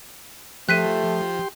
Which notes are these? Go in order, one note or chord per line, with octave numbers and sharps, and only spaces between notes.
F3 A3 G4 G5 C6 F#6 B6 D#7